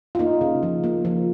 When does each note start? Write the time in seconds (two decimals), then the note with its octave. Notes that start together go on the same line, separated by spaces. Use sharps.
0.15 F4
0.19 A#3 D#4
0.41 C#3
0.63 F3
0.84 A#3
1.05 F3